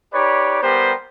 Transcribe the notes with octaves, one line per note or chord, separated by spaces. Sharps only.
D#4 G4 B4 C#5 D5
G3 B3 G4 A#4 C5